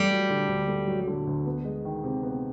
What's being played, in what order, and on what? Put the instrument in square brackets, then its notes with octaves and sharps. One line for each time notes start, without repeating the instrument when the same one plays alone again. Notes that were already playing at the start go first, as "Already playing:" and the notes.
Already playing: [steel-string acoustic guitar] G3 [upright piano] A3
[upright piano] F#3
D3
D2
A3
F#3
D3
D2
B3
G#3
D#3
C3
B3